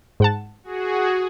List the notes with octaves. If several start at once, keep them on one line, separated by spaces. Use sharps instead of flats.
G#2 F#5 A5
F#4 G#4